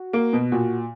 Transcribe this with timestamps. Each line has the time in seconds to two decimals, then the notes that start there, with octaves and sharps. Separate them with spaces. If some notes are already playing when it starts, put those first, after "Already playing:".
Already playing: F#4
0.13 A#3
0.33 B2
0.52 A#2 F#4